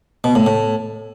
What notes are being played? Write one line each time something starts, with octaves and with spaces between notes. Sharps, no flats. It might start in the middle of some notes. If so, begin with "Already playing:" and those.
B2
A2
A2